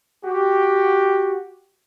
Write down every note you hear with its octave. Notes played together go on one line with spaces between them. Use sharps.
F#4 G4